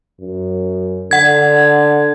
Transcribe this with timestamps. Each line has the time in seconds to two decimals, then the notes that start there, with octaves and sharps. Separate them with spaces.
0.20 F#2
1.11 D3 F#5 G#6